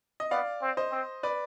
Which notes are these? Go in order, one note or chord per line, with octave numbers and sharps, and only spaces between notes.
D#5
B3 D5 F5
C4
C5 D#5
C4
B4 D5